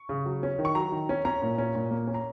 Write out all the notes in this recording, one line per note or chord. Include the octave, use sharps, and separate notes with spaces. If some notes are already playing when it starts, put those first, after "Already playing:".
Already playing: C#6
C#3
F#3
C#4
D#3
C#6
F#3 A#5
D#3
C#4
C#4 A#5
A#2
C#4
A#2
A#3
C#4
A#5